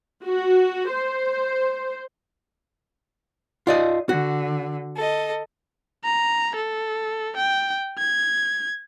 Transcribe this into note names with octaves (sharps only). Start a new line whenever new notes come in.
F#4
C5
F4 D5 D#5
D3 F#4
A4 D#5
A#5
A4
G5
G#6